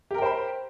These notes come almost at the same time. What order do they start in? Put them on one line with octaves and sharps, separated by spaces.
G4 A#4 G5 C5 B5